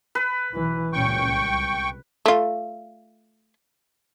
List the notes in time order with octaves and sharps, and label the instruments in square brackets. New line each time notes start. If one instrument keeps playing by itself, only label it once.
[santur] B4
[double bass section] B1 [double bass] E3
[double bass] C#2 [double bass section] F#2 A#2 C#4 [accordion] G5 C#6
[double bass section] C2
[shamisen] A3 F4